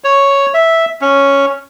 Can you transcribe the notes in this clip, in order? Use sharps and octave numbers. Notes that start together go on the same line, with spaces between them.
C#5
E5
C#4